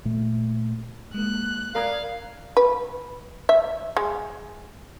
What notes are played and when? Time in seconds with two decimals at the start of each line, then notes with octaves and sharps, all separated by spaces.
0.05 A#2 A3
1.14 G#3 A#3 F#6
1.75 A#4 D5 F5 A#5 B5 D#6 G#6
2.57 B4
3.49 E5
3.97 G#3